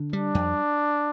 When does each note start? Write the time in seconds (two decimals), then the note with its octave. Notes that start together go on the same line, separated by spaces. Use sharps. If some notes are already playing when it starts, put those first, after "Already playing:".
Already playing: D3
0.13 G3 D4
0.35 F2